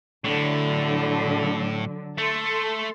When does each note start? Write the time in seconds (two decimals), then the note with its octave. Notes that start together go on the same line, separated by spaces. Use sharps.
0.24 A2 D3 F#3
2.18 A3 A4 C6